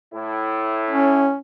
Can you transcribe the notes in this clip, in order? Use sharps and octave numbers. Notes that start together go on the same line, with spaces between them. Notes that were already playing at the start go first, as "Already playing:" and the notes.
A2 E4
C#4